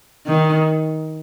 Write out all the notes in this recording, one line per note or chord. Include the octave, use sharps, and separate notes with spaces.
D#3